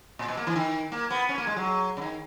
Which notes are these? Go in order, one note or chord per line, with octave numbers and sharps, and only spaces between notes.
A#2
B2
A#3
E3
D#3
A#3
B3
C#4
A#3
G#3
F#3
C#3
D#3